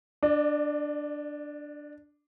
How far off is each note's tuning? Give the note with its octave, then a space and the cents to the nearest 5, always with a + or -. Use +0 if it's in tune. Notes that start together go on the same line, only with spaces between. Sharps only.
D4 +0 D5 +40